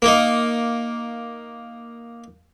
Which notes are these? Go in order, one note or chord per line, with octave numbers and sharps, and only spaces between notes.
A#3 D#4